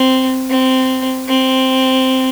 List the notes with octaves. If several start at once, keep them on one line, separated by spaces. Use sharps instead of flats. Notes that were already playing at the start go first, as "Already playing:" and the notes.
Already playing: C4
C4
C4